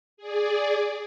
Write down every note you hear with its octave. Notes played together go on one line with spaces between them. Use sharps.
G#4 D5